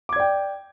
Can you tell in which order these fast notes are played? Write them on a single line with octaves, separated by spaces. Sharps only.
D6 G#6 D5 G5